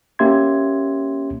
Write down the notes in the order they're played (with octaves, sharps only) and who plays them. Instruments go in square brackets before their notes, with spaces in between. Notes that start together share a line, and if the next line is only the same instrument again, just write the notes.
[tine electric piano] A#3 C#4 G4 E5 C6 G#6